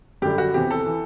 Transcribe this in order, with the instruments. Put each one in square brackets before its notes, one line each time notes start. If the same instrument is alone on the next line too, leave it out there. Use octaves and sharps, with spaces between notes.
[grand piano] F#2 D3 G3 G4
F#4
E2 C3 E3 G4
A4
E3